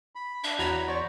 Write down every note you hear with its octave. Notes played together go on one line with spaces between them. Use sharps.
B5
D4 E5
E2 F#4 C#5 F#5 A#5 B5
C5 D5 C#6